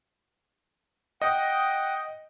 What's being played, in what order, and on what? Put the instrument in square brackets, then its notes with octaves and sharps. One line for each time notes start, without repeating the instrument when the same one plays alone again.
[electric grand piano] D#5 [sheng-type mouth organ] F#5 G5